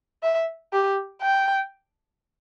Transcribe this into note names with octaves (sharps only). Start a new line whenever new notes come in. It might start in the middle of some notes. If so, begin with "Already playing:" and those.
E5
G4
G5